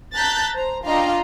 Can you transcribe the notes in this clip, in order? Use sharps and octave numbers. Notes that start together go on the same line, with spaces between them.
A5 A#5 F#6 G6 A6 B6
C5 A#5
D4 F4 D#5 F5 G5 A#5